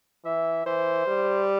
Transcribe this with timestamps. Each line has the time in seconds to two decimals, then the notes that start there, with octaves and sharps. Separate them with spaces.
0.25 E3 E5
0.66 E3 C5
1.07 G3